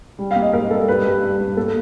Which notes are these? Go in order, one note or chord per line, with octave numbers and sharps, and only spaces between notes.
G3
A#3 F5
D#5
G#2 A#4
G3 A4
G3 B4
G2
G2
G2
A#3 A4